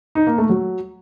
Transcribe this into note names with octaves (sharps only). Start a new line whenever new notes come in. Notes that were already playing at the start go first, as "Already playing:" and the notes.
D#4
A#3
A3
F#3